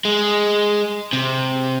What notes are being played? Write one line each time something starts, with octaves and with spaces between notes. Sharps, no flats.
G#3
C3